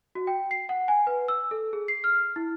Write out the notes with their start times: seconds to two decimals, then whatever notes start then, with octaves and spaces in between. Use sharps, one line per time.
0.15 F#4
0.27 G5
0.51 C7
0.69 F#5
0.88 G#5
1.07 B4
1.28 E6
1.51 A4
1.73 G#4
1.88 C7
2.04 F6
2.36 E4